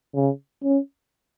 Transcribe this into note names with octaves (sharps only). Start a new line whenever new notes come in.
C#3
C#4